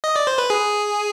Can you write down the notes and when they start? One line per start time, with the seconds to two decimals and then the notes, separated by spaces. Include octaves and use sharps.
0.04 D#5
0.16 D5
0.27 C5
0.38 B4
0.50 G#4